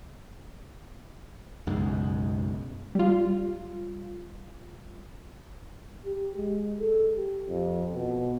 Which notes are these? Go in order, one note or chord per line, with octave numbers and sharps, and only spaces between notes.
B1 F#2 C#3 G#3
G3 F4
G4
G#3
A4
G4
F2
B2